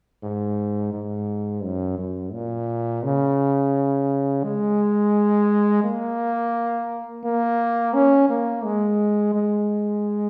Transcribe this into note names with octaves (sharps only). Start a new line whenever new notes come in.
G#2
G#2
F#2
F#2
A#2
C#3
G#3
A#3
A#3
C#4
A#3
G#3
G#3